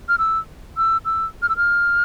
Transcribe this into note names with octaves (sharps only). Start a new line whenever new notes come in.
F6
E6
E6
E6
F6
E6
F6